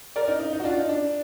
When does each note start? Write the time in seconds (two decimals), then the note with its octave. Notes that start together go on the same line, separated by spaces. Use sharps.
0.16 A#4 D5
0.28 D#4
0.40 D#4
0.53 D#4
0.60 F#4
0.64 D4 F4
0.77 D#4
0.89 D4